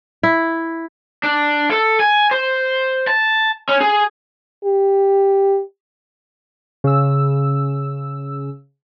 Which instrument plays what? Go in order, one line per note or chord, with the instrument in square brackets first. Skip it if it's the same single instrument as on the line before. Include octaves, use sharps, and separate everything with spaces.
[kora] E4
[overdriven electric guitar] D4
A4
G#5
C5
A5
C#4
G#4
[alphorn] G4
[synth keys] C#3 E6